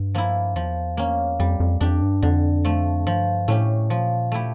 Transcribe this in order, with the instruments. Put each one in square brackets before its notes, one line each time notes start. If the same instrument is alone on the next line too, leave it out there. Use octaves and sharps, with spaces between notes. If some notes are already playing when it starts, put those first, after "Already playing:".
Already playing: [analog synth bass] G2
[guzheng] F3 A#3 E4
[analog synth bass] E2 [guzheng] F3
[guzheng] A#3 C#4
[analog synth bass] F2 [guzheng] G3
[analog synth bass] F2
[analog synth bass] F2 [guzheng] D4 G4
[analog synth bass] G2
[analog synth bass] F2 [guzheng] D3
[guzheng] F3 A3
[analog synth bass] G2 [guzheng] F3
[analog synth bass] A2 [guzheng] A3 C#4 G4
[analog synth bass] A#2 [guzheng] F3
[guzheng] A3 E4 G4